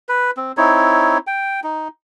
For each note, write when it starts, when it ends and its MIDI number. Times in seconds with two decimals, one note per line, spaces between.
0.09 0.31 71
0.37 0.52 60
0.57 1.18 60
0.57 1.18 63
0.57 1.18 64
0.57 1.18 73
1.27 1.60 79
1.64 1.88 63